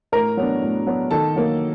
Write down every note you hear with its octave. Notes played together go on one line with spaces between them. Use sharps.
A2 A#4 A#5
F#3 B3 D4
A2
F#3 B3 D4
D#3 A4 A5
F#3 A#3